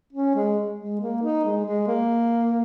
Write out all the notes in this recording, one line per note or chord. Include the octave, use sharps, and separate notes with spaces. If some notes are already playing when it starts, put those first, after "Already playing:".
C#4
G#3
G#3
A#3
D#4
G#3
G#3
A#3